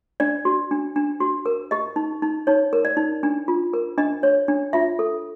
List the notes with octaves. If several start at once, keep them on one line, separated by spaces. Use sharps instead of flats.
D4 D5
F#4
D4
D4
F#4
A#4
G4 D#5
D#4
D#4
D#4 C#5
A#4
D5
D#4
D4
F4
A#4
D4 D#5
C#5
D4
F4 E5
A4